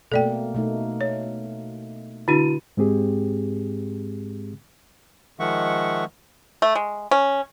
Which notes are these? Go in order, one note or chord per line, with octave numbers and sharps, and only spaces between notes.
B2 A3 A#3 A4 D5 G5
B2 A3 D#4
C#5
D3 D4 E4 F#4 D#7
G#2 G#3 C4 G4 G#4
D#3 F3 G#3 E5 F#5 C#6
A3
G#3
C#4